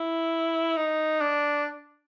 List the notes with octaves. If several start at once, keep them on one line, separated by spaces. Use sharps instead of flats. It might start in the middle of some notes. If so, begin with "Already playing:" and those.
Already playing: E4
D#4
D4